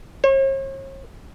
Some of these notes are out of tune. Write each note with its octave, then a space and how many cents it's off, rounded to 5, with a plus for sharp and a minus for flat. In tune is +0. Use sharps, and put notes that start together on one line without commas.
C#5 -45